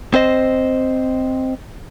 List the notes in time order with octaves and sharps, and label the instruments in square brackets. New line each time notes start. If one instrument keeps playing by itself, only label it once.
[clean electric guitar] C4 C5 D#5